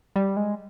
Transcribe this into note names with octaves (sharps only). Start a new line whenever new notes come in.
G3
G#3